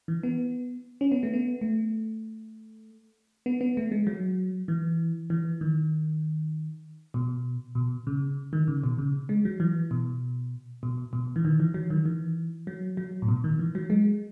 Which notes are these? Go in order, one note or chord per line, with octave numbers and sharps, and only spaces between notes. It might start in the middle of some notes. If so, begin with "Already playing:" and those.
E3
B3
C#4
B3
A3
B3
A3
B3
B3
A3
G#3
F#3
E3
E3
D#3
B2
B2
C#3
D#3
C#3
B2
C#3
G#3
F#3
E3
B2
B2
B2
E3
D#3
E3
F#3
D#3
E3
F#3
F#3
A2
B2
D#3
E3
F#3
G#3